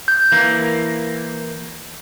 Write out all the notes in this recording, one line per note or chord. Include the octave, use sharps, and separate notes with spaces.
G6
E3 A#3